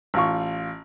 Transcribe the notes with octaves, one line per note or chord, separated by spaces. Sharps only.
A1 F4 C#6